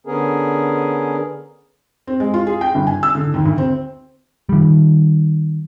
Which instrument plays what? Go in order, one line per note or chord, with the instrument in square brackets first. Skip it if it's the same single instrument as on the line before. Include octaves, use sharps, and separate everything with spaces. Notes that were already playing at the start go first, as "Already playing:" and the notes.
[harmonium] D3 B3 C#4 G#4 A#4
[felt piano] C4
G#3
F4
G#4
G5
G1
G#5
E6
D3
D#2
D2
C4
[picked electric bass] D#3 G3